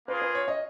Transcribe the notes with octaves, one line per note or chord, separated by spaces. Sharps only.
A#3 F4 G#4 B4
B4
C#5
D#5